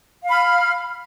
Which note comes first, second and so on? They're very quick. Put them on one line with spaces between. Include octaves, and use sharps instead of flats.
F5 B5 F6